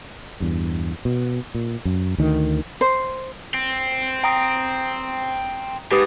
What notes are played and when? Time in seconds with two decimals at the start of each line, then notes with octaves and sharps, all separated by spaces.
0.40 E2 G2
1.05 B2
1.55 A#2
1.85 F#2
2.18 D2 D#3
2.81 C5
3.54 C4
4.24 G5 A#5 D#6
5.91 G#2 G4 B4 D#6